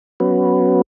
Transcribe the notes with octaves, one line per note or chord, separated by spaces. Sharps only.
F#3 B3 C#4 F#4 B4